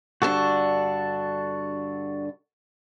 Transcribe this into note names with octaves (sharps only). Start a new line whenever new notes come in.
G2 D3 D4 F#4 A4